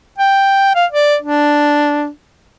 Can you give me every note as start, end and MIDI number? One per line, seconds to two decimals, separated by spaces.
0.18 0.75 79
0.75 0.86 77
0.92 1.17 74
1.22 2.08 62